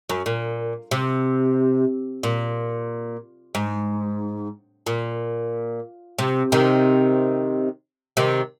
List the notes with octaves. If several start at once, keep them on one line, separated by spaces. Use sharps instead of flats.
F#2
A#2
C3
A#2
G#2
A#2
C3
C3 D#3
C3 D#3